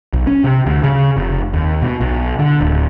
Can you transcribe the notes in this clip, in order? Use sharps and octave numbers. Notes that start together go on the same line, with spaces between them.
B1
C#4
C3
D2
C#3
F1
D#2
B2
B1
D3
D1